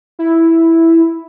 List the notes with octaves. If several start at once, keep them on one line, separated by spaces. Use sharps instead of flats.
E4